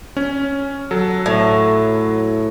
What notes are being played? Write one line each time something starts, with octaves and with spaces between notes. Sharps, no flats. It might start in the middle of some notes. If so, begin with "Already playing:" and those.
C#4
F#3 A4
A2